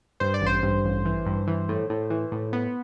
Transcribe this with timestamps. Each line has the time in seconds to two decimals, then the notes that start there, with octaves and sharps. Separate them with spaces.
0.20 G2 C5
0.34 D5
0.41 A1 C5
0.63 G2
0.84 A1
1.05 E3
1.26 G2
1.47 E3
1.69 A2
1.90 A2
2.10 E3
2.32 A2
2.53 B3